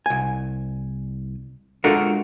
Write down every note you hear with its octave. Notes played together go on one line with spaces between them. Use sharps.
C2 G#5
G#3 D4 F4 F#4 A4 A#4